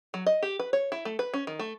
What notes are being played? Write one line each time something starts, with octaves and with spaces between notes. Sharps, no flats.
F#3
D#5
G4
B4
C#5
E4
A3
B4
C#4
D#3
A3